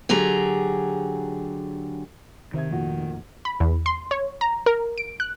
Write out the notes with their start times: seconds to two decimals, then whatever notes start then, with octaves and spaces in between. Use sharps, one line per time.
0.09 D3 F#3 G4 G#4 A#5
2.54 C3 D#3 E5 G#6
2.70 F1 A#2 F#4
3.45 B5
3.60 E2
3.86 C6
4.11 C#5
4.41 A#5
4.66 A#4
4.98 D7
5.20 F#6